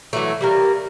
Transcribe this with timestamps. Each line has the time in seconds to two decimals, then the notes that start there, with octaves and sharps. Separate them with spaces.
0.13 E3 F#3 A3
0.41 G3 A#3 A#4